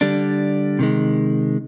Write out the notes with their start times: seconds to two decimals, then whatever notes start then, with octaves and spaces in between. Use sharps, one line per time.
0.01 D3 G3 D4
0.79 C3 D#3 G#3